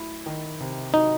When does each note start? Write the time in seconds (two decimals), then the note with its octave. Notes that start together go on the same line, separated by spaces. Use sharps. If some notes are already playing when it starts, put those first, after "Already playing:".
Already playing: F#3 A3 E4
0.26 D#3
0.60 C3
0.94 F#3 D#4